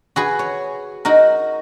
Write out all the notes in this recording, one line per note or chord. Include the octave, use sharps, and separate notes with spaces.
F#4 G#4 B4
C#5
D#4 F#4 A#4